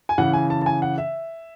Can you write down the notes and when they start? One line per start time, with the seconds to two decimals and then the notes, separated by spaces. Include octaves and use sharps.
0.09 G#5
0.18 C#3 E3 F#5
0.33 G#5
0.50 A5
0.62 A5
0.66 G#5
0.82 F#5
0.98 E5